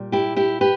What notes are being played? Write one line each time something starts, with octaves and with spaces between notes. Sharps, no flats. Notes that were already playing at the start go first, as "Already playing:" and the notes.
Already playing: A#2 G3
E4 G4
E4 G4
G4 B4